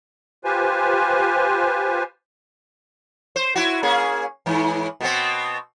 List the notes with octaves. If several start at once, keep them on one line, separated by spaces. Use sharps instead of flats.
F4 G4 B4 C5 G#5
C5
E4 F#4
A#3 C#4 G#4
G#2 E3
B2 B3 C4